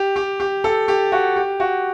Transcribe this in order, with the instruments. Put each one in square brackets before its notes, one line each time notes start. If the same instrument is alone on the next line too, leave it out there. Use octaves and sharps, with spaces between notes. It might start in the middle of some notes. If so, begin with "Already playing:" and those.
Already playing: [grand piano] G4
G4
G4
A4
G4
F#4
G4
F#4